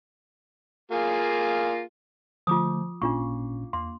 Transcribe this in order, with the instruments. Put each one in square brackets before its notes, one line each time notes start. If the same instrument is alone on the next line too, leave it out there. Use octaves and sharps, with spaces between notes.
[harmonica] A#3 F4 G#4
[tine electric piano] D3 A3 [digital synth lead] F3 [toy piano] F4 D6 D#6
[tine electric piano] A1 A#2 C#4 [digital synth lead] A#3 [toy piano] D4 F4 C#6
[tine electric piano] E2 [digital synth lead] A#3 [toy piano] C6